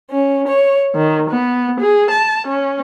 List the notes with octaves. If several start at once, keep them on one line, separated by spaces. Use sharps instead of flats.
C#4
C#5
D#3
B3
G#4
A5
C#4